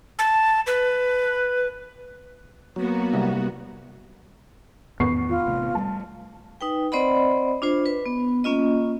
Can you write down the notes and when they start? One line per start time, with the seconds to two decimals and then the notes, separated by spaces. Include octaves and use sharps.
0.19 A5
0.67 B4
2.76 F#3 A#3 B3 F#4
3.13 C2
5.00 E2 A2 D#3 B3 C#6 C7
5.29 F4
5.46 A1 C3 A3
5.75 G3 A3 A5
6.61 D#4 B4 G5
6.92 C4 C5 D5 D#5 F#5 B5
7.62 D4 F4 C5
7.86 B4
8.06 B3
8.44 A#3 C#4 F4 D#5